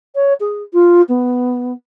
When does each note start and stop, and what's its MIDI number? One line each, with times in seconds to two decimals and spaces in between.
0.15 0.33 73
0.40 0.63 68
0.73 1.01 65
1.08 1.72 59